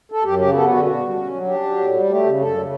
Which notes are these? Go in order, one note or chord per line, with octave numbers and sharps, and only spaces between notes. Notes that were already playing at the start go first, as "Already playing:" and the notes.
A4
F#2 G4
C#3 G4
B3 A4
D3 F#4
B2 F#4
G3
C#4
F#3
D4 G4
F#3
A2
G3
A3 G4
C#3
F#2 A4
C#3